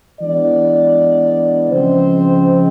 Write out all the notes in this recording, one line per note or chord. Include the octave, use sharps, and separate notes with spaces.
E3 G#3 B3 D4 D5
C#3 F3 G#3 C4 C5